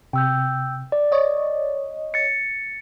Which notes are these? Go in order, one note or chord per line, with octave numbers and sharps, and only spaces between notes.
C3 G5 E6 G6
D5
C#5 D#5
A6 C#7